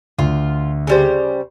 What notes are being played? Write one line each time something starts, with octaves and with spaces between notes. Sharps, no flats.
D2 F4
C#3 G3 C5